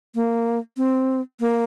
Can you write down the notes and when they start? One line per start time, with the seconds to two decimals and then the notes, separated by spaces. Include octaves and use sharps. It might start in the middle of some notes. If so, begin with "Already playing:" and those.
0.15 A#3
0.77 C4
1.40 A#3